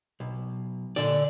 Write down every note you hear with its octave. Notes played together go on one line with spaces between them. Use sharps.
B1
A#2 D3 D4 D5